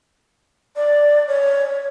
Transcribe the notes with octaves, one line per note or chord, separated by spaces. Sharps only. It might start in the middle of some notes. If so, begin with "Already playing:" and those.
D5
C#5